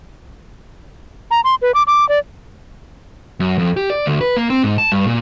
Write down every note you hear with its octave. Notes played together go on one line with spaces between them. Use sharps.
A#5
C6
B4
D6
D6
D5
F#2
F2
G4
D5
D2
B4
A#3
C4
G#2
A5
G2
A#2